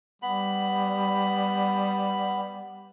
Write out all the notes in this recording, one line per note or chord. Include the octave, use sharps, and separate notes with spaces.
G3 B3 B5